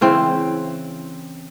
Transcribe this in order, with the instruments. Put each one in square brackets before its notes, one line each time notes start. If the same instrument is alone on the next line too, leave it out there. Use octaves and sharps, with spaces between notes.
[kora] C#3 E3 C4 E4